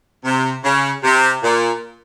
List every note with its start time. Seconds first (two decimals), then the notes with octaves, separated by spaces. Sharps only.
0.24 C3
0.64 C#3
1.04 C3
1.43 A#2